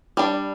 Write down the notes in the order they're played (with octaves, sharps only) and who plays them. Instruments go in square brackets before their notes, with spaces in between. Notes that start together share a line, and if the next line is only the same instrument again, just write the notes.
[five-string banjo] G3 D4 D5